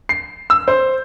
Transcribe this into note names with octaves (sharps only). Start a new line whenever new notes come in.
C7
E6
C5